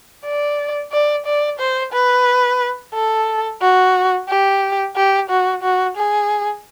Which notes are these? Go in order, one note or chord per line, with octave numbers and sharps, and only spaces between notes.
D5
D5
D5
C5
B4
A4
F#4
G4
G4
F#4
F#4
G#4